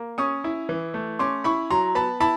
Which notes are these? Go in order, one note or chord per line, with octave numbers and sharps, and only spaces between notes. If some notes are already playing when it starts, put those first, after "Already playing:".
Already playing: A#3
C#4 C#6 D#6
E4
E3
A3
C#4 C6 D6
E4 B5 C#6
F#3 A#5 C6
B3 A5 B5
E4 A5 B5